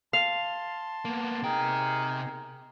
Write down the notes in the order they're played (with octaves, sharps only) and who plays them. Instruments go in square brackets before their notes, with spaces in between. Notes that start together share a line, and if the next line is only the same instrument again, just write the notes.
[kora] F5 [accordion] A5 C6
[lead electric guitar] A#3 B3
[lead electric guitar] C3 G5 [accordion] D#4 G#4 [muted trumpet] A#4